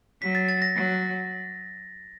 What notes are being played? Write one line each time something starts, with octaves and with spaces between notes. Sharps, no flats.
F#3 B6
A6
A6
A#6
F#3